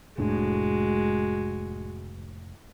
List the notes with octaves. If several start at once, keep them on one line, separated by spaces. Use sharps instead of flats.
F1 A2 G#3 D4 F#4